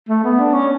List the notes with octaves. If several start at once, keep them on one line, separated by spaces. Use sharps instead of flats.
A3
B3
D4
C#4